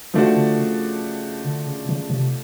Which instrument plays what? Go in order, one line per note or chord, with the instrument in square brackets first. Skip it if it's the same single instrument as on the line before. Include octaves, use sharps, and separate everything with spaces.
[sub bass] C#3 [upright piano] F3 A3 D4 F#4
[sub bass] D3
C#3
D3
C#3
C#3
C3